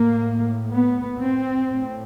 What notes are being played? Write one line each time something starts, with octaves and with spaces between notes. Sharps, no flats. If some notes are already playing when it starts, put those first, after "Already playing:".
Already playing: A2 A#3
B3
C4
A2